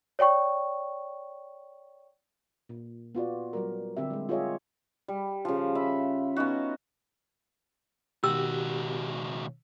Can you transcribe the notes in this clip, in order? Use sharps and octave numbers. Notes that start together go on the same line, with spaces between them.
C#5 D5 G5 C#6
A#2
B3 F4 F#4 D5
F#3 G3 A#4
D3 C4 G4 E5
G3 G#3
F4 G4 G#4 C#5 D#5 E5
G3
C#3 F3
E5 B5
B3 C#4 D#4 F#4
C#2 B2 D#3 F#4 G4 E6